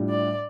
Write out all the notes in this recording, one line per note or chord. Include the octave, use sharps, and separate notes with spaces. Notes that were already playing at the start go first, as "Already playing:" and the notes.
Already playing: A2 G3 D4 F4
D5